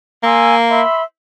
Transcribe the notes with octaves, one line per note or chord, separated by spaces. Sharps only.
A#3 G#5 C6 E6
E5 B5 C6